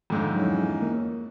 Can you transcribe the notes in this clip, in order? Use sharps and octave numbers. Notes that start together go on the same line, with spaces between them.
F2 G#2 D3
E2 F#3 C#4 D#4
A#3